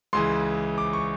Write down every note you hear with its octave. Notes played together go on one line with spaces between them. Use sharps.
C#2 C#3 E3 C6
D6
C#6